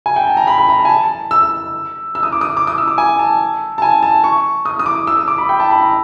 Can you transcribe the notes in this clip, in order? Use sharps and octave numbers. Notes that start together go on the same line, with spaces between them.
G#5
G5
A5
A#5
B5
B5
A#5
A5
G#5
A5
A5
E6
E6
D#6
D6
D#6
D6
D#6
E6
D6
G#5
A5
A5
G#5
A5
C#6
D#6
D#6
D6
E6
D#6
D6
B5
G5
A5
B5
A#5